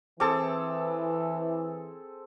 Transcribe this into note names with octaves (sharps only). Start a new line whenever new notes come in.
E3 C4 G#4 A4 A5 D6